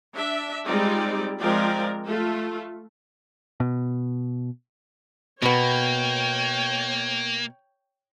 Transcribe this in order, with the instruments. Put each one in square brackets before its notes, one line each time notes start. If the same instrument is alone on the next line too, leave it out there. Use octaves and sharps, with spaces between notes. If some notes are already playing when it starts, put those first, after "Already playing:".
[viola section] D4 E5
G3 G#3 C4 D#4 F4 D5
F3 G#3 C4 F4 A#4 D5
A3 F4 A4
[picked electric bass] B2
[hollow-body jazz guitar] B2 B3 [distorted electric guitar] A#3 [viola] C#5 G5